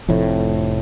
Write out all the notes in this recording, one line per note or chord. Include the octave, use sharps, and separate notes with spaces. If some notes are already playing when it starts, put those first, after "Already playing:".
F1 F2 A2